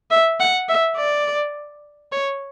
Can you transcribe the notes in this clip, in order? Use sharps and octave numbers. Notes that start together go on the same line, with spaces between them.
E5
F#5
E5
D5
C#5